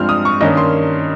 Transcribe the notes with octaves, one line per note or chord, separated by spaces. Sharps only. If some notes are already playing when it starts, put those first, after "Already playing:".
Already playing: G2 F3 G#3 C4 F6
D#6
C#6
G2 D#3 A#3 C#4 D#5
C6